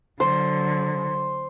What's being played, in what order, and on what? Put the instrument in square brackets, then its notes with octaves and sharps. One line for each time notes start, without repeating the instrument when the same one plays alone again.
[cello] D3 F#3 [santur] C5